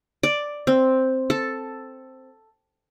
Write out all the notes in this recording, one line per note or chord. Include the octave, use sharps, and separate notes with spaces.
D5
C4
A4